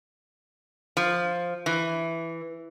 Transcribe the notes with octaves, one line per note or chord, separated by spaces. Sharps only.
F3
E3